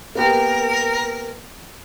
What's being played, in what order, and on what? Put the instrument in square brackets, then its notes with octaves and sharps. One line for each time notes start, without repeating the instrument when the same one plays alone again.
[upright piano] A#3 B3 G4 [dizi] A#4